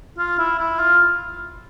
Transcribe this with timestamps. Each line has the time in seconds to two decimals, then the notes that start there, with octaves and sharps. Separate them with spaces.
0.18 F4
0.38 E4
0.59 E4
0.80 F4